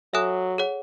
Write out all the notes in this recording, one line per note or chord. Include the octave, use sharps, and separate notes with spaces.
F#3 A4 E5 G#5 D#6 F#6
G#4 C#5 F#5